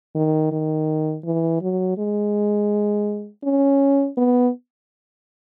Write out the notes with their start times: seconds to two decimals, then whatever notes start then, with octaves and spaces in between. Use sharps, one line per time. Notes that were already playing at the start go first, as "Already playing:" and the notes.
0.15 D#3
0.52 D#3
1.25 E3
1.61 F#3
1.98 G#3
3.43 C#4
4.17 B3